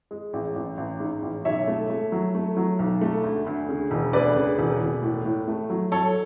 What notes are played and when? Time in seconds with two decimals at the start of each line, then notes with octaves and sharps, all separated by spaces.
0.11 G#3
0.33 A1
0.56 A1
0.77 A1
1.00 G#2
1.22 A1
1.45 B1 C#5 E5
1.67 A3
1.90 A3
2.12 F#3
2.35 A3
2.57 F#3
2.79 B1
3.01 A3
3.24 D2
3.46 D2
3.69 C#3
3.91 E1
4.13 D2 B4 D5
4.36 C#3
4.58 E1
4.81 E1
5.02 A2
5.25 A2
5.48 A3
5.70 F#3
5.92 F#3 A4 C#5